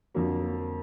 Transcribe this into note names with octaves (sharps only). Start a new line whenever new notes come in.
F2 D3 F#3 A#3
A#3